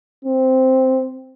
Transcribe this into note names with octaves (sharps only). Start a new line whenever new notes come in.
C4